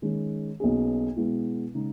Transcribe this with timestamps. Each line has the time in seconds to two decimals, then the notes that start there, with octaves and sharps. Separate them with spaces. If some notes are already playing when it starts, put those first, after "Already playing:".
0.02 D#3 G#3 C#4
0.60 B1 B2 A#3 C#4 G#4
1.17 B2 G#3 B3 E4
1.75 C#3 G#3 D#4